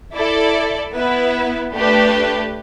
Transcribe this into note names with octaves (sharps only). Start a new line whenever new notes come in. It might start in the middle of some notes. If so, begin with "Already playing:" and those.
E4 A4 D5
B3 E4 B4
A3 D4 G4 B4